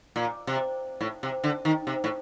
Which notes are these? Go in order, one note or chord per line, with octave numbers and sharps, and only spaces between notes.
A#2
C3
A2
C3
D3
D#3
C3
A2